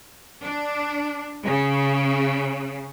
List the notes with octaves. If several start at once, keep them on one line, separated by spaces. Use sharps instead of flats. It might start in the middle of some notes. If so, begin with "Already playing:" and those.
D4
C#3